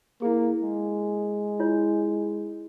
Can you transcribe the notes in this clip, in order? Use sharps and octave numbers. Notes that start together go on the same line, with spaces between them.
A#3 E4 G#4
G#3
E4 F4 C#5